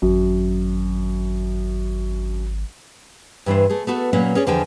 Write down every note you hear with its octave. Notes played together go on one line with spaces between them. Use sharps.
G#1 F#2
G2 E3 D4 C5
A3 G#4
A3 B3 F#4 A4
A#2 F#3 A#3 C#4 B4
C#4 G#4 C#5 D5
E2 D3 F3 G5 G#5